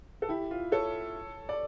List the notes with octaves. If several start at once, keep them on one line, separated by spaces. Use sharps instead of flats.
A4
E4 G4
F4
A4 C#5
D5